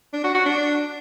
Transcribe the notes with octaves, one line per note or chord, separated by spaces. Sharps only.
D4
F#4
F#4
D4